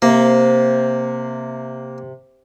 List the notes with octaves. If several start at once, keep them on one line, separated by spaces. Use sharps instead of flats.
C3 A#3